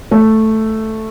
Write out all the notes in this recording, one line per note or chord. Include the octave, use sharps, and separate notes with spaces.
A3